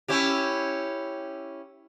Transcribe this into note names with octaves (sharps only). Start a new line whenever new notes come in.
C#4 E4 G4